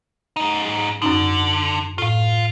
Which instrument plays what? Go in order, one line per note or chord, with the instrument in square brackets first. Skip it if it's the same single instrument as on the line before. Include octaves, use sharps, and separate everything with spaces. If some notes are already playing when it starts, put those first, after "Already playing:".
[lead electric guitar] F#2 D#4
[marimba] G#2
[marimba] F#2 C#4 D#4 [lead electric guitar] D3
[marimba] A2 [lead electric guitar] F4 F5